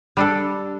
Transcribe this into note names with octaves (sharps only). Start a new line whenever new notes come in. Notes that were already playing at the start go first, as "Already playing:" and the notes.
G3 D4 A4